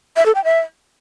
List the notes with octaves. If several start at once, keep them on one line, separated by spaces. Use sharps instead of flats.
E5
A4
G5
E5